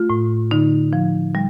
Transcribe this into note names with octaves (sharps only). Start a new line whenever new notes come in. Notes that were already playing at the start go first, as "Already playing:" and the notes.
Already playing: A3 F4
A2
D3 D#4
F3
G3